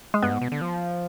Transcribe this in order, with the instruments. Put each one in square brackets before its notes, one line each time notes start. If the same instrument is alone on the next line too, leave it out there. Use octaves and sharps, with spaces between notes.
[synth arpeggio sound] G#3
[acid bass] G2 [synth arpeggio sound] B3
[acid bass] G#2
B2
D3
F3